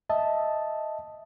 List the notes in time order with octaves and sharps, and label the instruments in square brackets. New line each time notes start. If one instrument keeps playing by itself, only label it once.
[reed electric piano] D#5 E5 A5